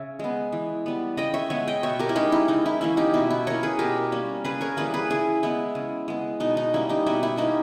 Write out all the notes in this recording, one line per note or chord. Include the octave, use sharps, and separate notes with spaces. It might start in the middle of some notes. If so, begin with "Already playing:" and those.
Already playing: C#3 C#5 E5
G#3 B3
E3
G3 B3
C#3 D#5 G5
C#5 E5
G#3 B3 C#5 E5
D#5 G5
B2 C#5 E5
G4 A#4
E4
G#3 C#4 D#4 G4
E4
C#3 D#4
E4
E3 A#3 C#4 E4
D#4 G4
B2 E4
E4
A#3 C#4 A#4 C#5
G#4 B4
B2 G4 A#4
G3 A#3 C#4
C#3 G#4 B4
A#4 C#5
E3 G3 A#3 G#4 B4
G#4 B4
C#3 E4 G#4
G#3 B3 E4
C#3
G#3 B3
B2 D#4
D#4
G3 A#3 C#4 E4
D#4 G4
B2 E4
E4
A#3 C#4 D#4 G4